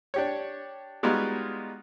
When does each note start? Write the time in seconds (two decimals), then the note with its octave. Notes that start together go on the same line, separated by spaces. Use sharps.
0.14 D4 G4 C#5
1.03 G3 G#3 B3 D#4 F4 F#4